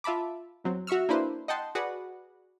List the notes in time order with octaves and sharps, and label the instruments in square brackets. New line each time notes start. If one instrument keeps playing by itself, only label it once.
[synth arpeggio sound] F4 E5 A5 B5 D6
E2 F#3 C4
F#4 E5 C#6 E6 F6
A#3 D4 E4 B4 C5
D#5 F#5 G5 A5 C6
F#4 G#4 B4 D5 F#5